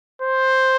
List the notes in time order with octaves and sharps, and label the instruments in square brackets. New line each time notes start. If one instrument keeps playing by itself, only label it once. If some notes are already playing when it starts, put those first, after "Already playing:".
[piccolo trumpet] C5